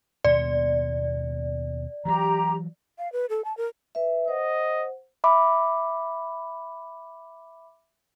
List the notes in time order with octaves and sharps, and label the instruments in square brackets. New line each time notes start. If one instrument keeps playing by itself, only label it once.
[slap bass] D#2 B2 B3 [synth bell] D5
[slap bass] E3 F#3 [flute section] G4 A#5
[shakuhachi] F5
B4
A4
A5
A#4
[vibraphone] B4 E5
[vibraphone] C5 F#5 [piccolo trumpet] D#5
[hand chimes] E5 B5 D6